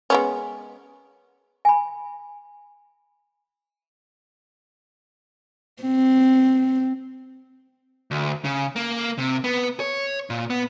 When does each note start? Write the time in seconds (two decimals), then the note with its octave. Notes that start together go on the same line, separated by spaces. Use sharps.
0.10 G#3 B3 C#4
1.65 G#5 B5
5.83 C4
8.11 D2
8.44 C#3
8.76 A#3
9.18 C3
9.44 B3
9.80 C#5
10.30 A#2
10.50 B3